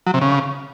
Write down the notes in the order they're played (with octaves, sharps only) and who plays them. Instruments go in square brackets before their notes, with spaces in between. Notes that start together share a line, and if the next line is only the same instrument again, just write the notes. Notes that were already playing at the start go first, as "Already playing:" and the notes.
[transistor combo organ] F#3
C3
C#3